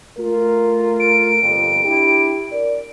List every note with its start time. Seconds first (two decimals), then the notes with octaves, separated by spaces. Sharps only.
0.19 A3 F4 A#4
1.00 D7
1.42 G1 F2
1.85 D4 E4 G4
2.52 A#4 D5